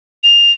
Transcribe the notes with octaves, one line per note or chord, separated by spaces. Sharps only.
F7